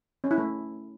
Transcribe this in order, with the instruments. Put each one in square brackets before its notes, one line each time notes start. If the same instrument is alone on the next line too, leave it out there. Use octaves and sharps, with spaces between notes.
[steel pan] C#4
E4
A3